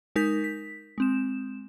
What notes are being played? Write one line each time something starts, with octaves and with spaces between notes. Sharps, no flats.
G#3 D#4 A#4 G6 B6
B6
G#3 C4 E7